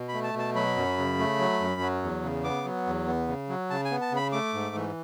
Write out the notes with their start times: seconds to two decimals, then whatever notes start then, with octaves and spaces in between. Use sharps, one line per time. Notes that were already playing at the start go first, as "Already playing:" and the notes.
Already playing: B2
0.09 A3 B5
0.24 A5
0.34 B2
0.39 A5
0.55 F#3 B5
0.76 F#2
0.98 C#3
1.18 A3
1.39 F#3
1.60 F#2
1.81 F#3
2.03 E2
2.23 C#3
2.44 B3 D6
2.65 F#3
2.87 E2
3.07 B3
3.28 C#3
3.49 F#3
3.70 C#3 A5
3.85 G#5
3.91 B3
4.01 A5
4.12 C#3 B5
4.32 A3 D6
4.53 G#2
4.75 E3